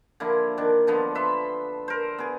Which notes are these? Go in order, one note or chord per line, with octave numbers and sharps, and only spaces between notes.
D3 F3 A#3 E4
D#3 D4
D3 F3 B3
B4 E5 C6
A#4 C5
B3 G#4